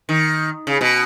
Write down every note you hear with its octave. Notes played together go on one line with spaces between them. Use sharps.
D#3
C#3
B2